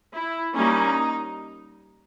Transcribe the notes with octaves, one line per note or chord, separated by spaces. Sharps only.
E4
G3 A#3 C#4 D#4